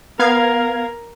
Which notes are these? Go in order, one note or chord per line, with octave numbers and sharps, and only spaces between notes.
B3 A#4 F5 G#6